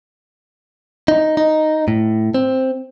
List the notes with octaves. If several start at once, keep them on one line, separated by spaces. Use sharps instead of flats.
D#4
D#4
A2
C4